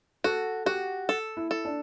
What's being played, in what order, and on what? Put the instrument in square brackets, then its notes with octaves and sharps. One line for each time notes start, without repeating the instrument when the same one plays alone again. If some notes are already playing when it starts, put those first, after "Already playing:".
[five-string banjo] F#4 [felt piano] A4
[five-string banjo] F#4 [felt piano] G4
[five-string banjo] A4
[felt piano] E4
[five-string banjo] A4
[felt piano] D4